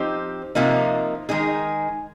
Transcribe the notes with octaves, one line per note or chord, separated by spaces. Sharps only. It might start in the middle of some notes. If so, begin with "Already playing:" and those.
Already playing: F3 C4 D#4 G4
C3 F3 A#3 D#4
D#3 G#3 D#4 G#4